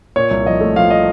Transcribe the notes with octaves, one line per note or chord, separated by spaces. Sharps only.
A#2 C#5
C2
F3 D#5
A3
F3 F5
D#5